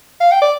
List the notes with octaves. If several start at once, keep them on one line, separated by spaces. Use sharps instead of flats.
F5
G5
D5